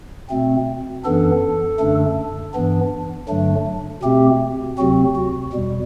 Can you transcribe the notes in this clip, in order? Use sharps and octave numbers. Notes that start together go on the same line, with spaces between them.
B2 A3 C4
F#2 E3 B3 D4 A4
F#2 D3 A3 D4
G2 E3 B3 D4
G2 D3 F#3 A3 D4
B2 A3 C4 G4
D2 C3 F#3 C4 F#4
F#4
E2 B2 G3